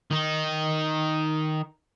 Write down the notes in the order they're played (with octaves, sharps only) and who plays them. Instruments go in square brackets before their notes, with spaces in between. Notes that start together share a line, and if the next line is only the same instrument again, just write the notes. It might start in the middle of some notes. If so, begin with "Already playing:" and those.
[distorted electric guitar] D#3 D#4